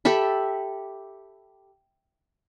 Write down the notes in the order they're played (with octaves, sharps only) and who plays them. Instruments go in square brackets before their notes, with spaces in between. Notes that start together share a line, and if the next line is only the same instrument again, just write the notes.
[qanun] G4 A4 E5 B5